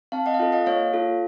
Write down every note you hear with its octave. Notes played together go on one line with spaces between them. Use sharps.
C4 F5 A5
D#5 F#5
F5
F4 A4 D#5 F#5
D#5 F#5
A#3 C#5 F5
F4 A4